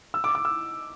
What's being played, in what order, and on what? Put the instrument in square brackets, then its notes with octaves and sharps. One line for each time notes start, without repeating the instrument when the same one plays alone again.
[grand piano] E6
D6
D6
E6